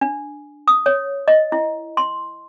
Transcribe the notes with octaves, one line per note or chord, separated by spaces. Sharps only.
D4
D#6
C#5
D#5
E4
C6